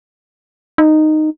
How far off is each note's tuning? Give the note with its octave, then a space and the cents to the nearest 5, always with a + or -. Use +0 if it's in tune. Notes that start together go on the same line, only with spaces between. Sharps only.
D#4 -10